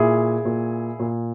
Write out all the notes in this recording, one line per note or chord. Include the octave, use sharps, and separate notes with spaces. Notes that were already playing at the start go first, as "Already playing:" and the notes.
Already playing: A#2 E4 G#4
A#2
A#2